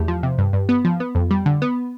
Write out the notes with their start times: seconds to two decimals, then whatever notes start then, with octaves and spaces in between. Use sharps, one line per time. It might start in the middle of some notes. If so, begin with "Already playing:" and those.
Already playing: E2 A3 G4
0.08 F3
0.23 C3
0.38 G2
0.53 G2
0.69 B3
0.85 F3
1.00 B3
1.15 F2
1.31 G3
1.46 D3
1.62 B3